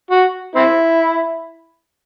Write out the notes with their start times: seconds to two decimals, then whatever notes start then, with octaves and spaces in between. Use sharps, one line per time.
0.11 F#4
0.56 C4 E4